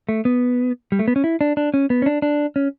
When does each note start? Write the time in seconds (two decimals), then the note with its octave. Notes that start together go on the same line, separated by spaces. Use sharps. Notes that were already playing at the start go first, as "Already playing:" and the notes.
0.09 A3
0.25 B3
0.92 G3
0.99 A3
1.08 B3
1.16 C#4
1.24 E4
1.41 D4
1.57 D4
1.74 C#4
1.90 B3
2.02 C#4
2.06 D4
2.22 D4
2.56 C#4